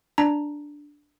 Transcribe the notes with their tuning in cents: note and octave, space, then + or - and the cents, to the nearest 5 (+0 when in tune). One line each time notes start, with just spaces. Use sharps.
D4 +0 A#5 +0